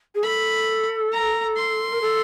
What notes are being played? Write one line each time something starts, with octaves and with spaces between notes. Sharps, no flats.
G#4
A4 B5
A#5
C6
A#4
A4